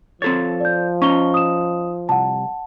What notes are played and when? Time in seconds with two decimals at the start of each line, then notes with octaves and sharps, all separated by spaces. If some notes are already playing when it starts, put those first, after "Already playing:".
0.22 F3 C4 A4 C#5 A6
0.61 D5 G6
1.02 C#4 D#4 C#6 G7
1.34 D#6 E7
2.09 C2 F#5 A5